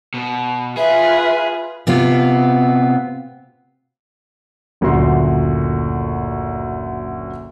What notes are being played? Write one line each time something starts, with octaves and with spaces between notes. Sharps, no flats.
B2
F4 G#4 B4 E5
C3 B3 C4 F4
F#1 D2 A#2 F#4 C6